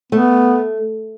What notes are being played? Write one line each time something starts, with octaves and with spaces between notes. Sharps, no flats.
A3 B3